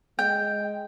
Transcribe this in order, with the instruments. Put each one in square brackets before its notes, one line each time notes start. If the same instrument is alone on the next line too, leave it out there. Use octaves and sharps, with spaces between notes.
[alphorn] G#3 [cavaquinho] G5